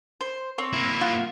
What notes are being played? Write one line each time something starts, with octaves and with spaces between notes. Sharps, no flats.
C5
C4 C#5
A#3 E4
F4 F#5